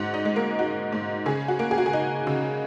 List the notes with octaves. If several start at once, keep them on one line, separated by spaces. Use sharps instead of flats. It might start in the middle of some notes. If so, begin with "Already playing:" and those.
Already playing: G#2 C#4 F#4 F#5
D#4 D#5
G#3
A#3 A#4
D#4 F#4
G#2
C#3 G#4
F#4
A#3
G#4
F#4
G#4
D#4
C#3